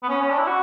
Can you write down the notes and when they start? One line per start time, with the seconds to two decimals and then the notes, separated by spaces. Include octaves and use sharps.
0.03 B3
0.09 C#4
0.21 C#4
0.30 D4
0.38 E4
0.47 F#4